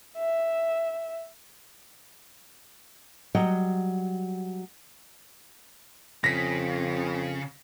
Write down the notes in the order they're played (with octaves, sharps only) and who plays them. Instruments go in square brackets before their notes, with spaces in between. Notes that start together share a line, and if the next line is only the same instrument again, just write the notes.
[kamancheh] E5
[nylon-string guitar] F#3 G3 D#5 F#5 G5
[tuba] F2 [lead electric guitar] C#3 [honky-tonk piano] A#6 B6